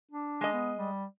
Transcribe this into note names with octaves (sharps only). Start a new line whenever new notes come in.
D4
G#3 D#5
B3
G3